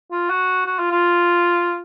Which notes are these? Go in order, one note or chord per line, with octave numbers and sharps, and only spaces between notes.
F4
F#4
F#4
F4
F4